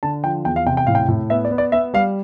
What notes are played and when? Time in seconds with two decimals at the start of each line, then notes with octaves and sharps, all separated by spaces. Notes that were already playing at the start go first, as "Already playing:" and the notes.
0.03 D3 A5
0.24 F3 G5
0.45 E2 G5
0.56 F5
0.67 C3 G5
0.77 G5
0.87 A2 F5
0.95 G5
1.08 A2
1.30 B3 E5
1.45 D5
1.51 B3
1.58 D5
1.72 B3 E5
1.94 G3 F5